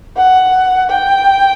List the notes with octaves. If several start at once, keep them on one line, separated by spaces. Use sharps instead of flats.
F#5
G5